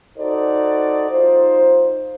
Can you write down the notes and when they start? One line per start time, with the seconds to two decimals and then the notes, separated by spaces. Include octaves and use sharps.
0.18 D#4 F#4 A4 C5 D5
1.11 D#4 F4 C5